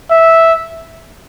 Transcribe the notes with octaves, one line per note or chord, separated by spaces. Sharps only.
E5